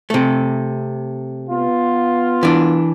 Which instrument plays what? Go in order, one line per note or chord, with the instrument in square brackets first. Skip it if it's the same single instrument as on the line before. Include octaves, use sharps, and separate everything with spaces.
[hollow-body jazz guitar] C3 A3
[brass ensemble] B3 F4
[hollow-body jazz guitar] E3 D4